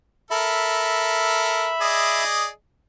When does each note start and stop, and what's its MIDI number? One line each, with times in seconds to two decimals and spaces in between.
0.31 1.71 69
0.31 1.71 70
0.31 2.23 76
0.31 2.23 83
1.81 2.48 68
1.81 2.48 74
1.81 2.48 75